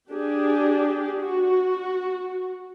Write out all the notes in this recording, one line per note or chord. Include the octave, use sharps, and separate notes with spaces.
D4 G4 G#4
F#4